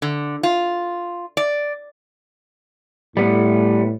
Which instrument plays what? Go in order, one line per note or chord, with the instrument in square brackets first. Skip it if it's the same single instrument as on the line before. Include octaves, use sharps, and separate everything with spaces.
[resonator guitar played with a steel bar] D3
F4
D5
[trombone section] A2 [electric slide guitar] G3 B3